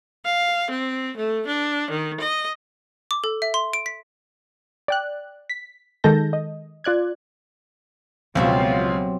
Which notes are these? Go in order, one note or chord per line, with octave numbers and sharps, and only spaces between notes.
F5
C4
A3
D4
D#3
D#5
D6
A4
E5
C6
D7
B6
D5 G5 F#6
B6
D#3 G#3 A4 A5 G6 A#6
D#5
F4 D5 F#6 G#6
C#2 B2 F#3 C4 F4 G4 E5